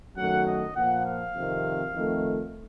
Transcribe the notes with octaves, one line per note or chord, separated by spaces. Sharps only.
F#2 D#3 F#3 A3 F#5
D#5
A#2 F3 A#3 F#5
F5
F2 C3 D#3
F2 D#3 A3